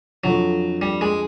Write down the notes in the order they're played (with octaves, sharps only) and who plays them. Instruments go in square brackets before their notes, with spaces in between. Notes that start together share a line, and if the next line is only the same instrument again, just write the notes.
[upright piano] F2 D3 F3 [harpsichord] F#3
[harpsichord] G3
G#3